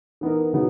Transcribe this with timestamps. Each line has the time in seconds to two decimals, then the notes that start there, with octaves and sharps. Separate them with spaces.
0.21 E3 B3 D#4 A#4
0.53 C#3 F#3 B3 D#4